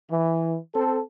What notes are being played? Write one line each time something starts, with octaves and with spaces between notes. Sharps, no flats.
E3
C4 A4